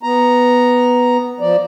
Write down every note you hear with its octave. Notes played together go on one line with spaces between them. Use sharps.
B3 A#5
F3 D5